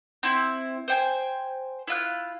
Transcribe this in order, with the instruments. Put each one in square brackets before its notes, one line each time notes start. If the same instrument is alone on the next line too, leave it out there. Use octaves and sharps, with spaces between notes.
[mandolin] C4 E4
C5 G5 G#5
E4 F4 F#6